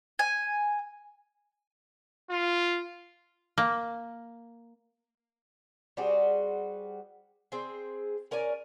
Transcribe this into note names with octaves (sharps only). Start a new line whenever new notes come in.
G#5
F4
A#3
G3 C4 F#4 G#4
C4 G#4
C#4 A#4 D5 G#5